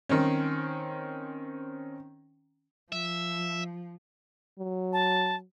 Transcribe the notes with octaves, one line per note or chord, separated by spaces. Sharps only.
D#3 C4 C#4
F3 E5
F#3
A5